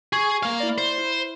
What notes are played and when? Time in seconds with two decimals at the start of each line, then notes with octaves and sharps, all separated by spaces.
0.13 G#4 C#6 G#6
0.43 A#3 F5
0.60 E4 D5
0.78 C5
0.98 E4